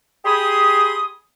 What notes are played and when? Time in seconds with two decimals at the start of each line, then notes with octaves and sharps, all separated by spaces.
0.25 G4 G#4 G#5 B5 C6 D#6